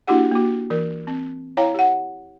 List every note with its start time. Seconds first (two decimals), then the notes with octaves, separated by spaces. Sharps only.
0.07 A#3 D4 E4 F#4 G4 F#5
0.32 A#3 F#4
0.70 E3 A#4
1.07 C4
1.57 E4 C#5 F5 G5 A#5
1.74 G4 F#5